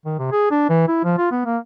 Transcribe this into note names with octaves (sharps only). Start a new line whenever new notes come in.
D#3
C3
G#4
D4
E3
E4
F3
F4
B3
A#3